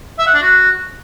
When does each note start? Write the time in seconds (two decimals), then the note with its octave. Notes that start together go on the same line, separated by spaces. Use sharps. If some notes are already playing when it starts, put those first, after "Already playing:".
0.19 E5
0.27 F#5
0.34 D4
0.42 F#4